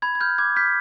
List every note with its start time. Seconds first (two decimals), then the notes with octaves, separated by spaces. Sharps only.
0.02 B5 G#6
0.15 G#6
0.21 F6 G6
0.38 D6 G#6
0.56 F6 G6 B6